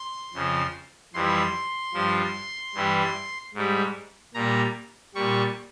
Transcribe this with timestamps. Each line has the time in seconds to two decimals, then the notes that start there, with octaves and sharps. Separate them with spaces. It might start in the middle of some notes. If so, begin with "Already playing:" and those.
Already playing: C6
0.34 F2 C#3 F3
1.14 F2 E3 G3 C6
1.94 G2 F3
2.75 G2 E3 G3
3.54 G#2 G3
4.34 A#2 G3 A#5
5.15 A#2 G3 C#6